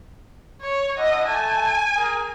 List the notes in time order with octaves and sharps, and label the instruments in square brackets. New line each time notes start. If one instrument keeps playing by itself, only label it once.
[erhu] C#5
[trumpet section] D4 E4 F#5 [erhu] D#5
[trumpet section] A3 A5 [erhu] G#5
[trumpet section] G#4 A#4